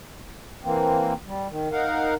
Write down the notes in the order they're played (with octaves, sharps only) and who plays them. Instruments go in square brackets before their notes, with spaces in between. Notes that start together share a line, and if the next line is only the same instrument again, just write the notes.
[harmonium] E3 A#3 C4
G3
D#3
D#4 A#4 F5 F#5